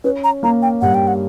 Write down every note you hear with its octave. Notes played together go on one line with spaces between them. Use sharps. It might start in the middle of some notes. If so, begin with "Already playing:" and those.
C#4 B4
A#5
A#3 A#5
G5
G2 F#5
G5
F#5